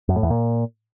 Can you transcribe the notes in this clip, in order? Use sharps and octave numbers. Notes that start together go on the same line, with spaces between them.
F#2
A2
E2
A#2